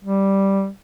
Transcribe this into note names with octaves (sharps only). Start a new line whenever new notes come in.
G3